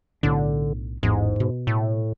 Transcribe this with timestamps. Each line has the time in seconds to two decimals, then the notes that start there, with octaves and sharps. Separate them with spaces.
0.23 B1 A2 D3 D4
1.03 A1 E2 G#2
1.40 B2
1.67 A2